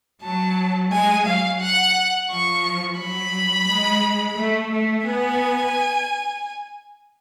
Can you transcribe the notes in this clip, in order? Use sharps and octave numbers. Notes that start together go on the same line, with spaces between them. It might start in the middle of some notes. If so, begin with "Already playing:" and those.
F#3 A5
G#3 G#5
F#3 F5
F#5
F3 C#6
F#3 B5
G#3
A3
A3
B3 G#5